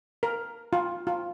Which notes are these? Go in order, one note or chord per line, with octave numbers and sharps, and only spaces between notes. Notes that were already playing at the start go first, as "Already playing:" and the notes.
A#4
F4
F4